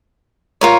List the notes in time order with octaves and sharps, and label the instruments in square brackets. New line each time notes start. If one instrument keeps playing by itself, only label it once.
[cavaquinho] F4 A#4 C#5